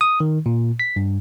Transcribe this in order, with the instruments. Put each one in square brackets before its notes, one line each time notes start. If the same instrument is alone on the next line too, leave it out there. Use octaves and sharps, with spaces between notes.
[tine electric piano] D#6
D#3
A#2
B6
G2